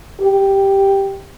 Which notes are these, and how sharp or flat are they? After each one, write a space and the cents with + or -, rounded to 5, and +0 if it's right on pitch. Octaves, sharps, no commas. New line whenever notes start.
G4 +0